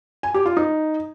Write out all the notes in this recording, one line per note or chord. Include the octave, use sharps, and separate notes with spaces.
G#5
G4
F4
D#4